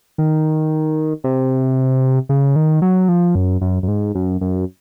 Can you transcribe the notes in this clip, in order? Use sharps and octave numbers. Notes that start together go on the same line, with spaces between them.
D#3
C3
C#3
D#3
F#3
F3
F#2
F#2
F#2
G#2
F#2
F#2